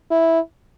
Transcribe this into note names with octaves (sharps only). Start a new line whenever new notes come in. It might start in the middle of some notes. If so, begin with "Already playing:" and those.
E4